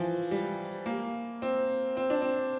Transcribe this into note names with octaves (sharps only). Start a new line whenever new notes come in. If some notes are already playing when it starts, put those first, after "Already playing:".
Already playing: E3 F3
G3
A#3
C4
C4
D4
C4